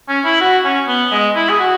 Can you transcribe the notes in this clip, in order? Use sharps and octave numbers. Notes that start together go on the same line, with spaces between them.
C#4
E4
F#4
C#4
B3
G#3
E4
G#4
F#4